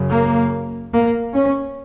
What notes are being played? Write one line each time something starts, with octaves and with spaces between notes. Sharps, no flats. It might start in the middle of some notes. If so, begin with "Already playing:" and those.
Already playing: F#2 C#3
A#3
A#3
C#4